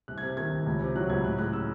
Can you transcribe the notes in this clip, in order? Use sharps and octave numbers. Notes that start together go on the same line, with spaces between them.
C2 F#6
G#6
C3
D#3 G#6
C2
C#2
C3
F#3 F#6
C#2 G#6
A2 F#6
G#3 F#6
C#4 E6